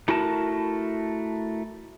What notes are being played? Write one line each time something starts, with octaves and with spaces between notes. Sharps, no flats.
A3 E4 F#4 A#4 G5 A5